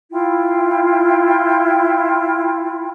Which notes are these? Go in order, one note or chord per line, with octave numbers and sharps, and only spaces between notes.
E4 F4 G5